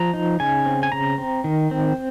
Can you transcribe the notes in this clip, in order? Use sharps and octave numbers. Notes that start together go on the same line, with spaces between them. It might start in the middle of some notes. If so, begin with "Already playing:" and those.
Already playing: F3 A#5
D#4
C#3 G#5
C4
G#5
C#3 A#5
C4
D#3
C4